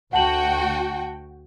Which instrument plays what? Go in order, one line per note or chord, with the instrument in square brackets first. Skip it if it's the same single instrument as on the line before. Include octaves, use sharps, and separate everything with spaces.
[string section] D2 F#4 G5 [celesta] F#5 A5 F#7